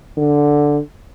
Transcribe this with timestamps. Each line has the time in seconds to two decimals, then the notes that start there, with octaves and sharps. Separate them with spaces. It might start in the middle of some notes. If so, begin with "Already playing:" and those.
0.17 D3